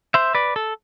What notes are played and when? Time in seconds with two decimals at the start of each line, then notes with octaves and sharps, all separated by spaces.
0.14 C5 E5
0.35 B4 D5
0.56 A4